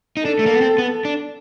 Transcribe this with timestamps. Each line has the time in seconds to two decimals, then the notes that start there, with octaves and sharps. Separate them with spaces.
0.17 D#4
0.25 D4 A4
0.39 A3
0.46 A#3
0.54 B3
0.61 C4
0.78 B3
1.05 D4